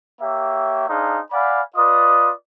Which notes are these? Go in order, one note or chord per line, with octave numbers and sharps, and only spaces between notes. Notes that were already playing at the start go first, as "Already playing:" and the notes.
A#3 G4 C#5 E5
D4 D#4 G#4 C5 F5 A#5
D5 F5 F#5 G#5 B5
F4 B4 D5 D#5 D#6